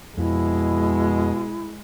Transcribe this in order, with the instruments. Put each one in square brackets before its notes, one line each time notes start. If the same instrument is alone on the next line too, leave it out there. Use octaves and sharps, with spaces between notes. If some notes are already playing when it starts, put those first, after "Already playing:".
[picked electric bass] F2 [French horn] B2 [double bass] G#3 [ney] E4